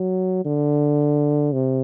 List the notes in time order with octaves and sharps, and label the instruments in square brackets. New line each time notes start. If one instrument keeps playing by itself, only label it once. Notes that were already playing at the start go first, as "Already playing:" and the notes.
Already playing: [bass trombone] F#3
D3
C3